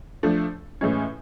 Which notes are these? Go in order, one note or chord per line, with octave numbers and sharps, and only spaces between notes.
F3 A3 D4
A2 E3 G#3 C#4